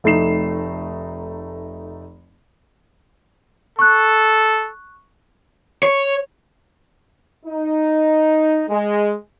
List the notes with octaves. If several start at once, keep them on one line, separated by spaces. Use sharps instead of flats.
F1 A3 D#4 C7 E7
A4 C#6 F#6
C#5
D#4
G#3